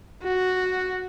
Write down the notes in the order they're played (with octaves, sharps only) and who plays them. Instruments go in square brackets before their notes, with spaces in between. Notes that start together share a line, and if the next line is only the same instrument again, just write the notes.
[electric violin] F#4